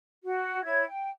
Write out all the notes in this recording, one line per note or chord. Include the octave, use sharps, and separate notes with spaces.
F#4
E4 C#5 G#6
G5